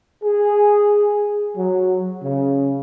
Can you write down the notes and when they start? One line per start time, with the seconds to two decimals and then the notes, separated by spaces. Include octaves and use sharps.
0.23 G#4
1.56 F#3
2.22 C#3